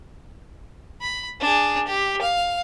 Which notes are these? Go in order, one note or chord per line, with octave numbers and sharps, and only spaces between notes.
B5
D4 G#4
G4
F5